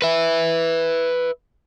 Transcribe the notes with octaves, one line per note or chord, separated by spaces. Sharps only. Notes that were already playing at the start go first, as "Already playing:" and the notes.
B4 E5